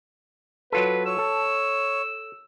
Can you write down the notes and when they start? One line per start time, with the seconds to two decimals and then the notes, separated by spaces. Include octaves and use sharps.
0.72 F#3 F4 A4 B4
1.05 C#5 E6
1.19 A4